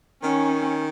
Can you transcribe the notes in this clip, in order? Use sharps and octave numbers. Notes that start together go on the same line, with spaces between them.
D#3 C#4